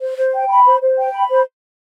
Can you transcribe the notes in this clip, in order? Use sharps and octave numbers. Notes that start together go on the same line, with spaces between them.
C5
C5
G5
B5
C5
C5
G5
B5
C5